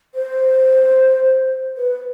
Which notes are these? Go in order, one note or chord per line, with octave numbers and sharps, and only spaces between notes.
C5
B4